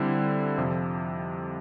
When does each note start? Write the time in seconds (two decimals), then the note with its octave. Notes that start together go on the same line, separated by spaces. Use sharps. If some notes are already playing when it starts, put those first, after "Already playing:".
Already playing: D3 G3 C4 E4
0.58 F2 C3 F3